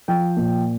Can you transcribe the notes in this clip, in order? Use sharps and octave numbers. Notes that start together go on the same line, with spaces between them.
F3 G5
A#2